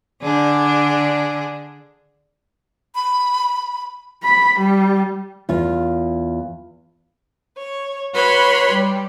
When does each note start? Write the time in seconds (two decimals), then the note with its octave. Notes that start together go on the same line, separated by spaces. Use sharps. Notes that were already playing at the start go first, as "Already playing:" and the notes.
0.21 D3 D4 G#4
2.95 B5
4.24 B5
4.59 G3
5.49 E2 F4
7.57 C#5
8.13 F#4 B4 C#5 B5 C6
8.71 G3